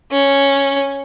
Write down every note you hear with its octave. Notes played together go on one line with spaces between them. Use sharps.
C#4